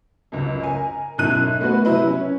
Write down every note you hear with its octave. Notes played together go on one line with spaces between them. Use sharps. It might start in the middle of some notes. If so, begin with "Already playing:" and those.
C#2 F#2
A#4 G#5
B1 F#2 E4 F#6 D#7
A3 B3 F#4 B4
C3 F#3 E4 B4
C#4